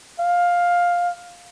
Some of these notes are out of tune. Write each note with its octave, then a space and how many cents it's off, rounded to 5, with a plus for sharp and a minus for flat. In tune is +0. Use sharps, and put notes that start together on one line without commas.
F5 +10